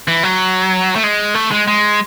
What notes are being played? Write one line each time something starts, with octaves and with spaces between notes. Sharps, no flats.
E3
F#3
A3
G#3
A3
G#3
G#3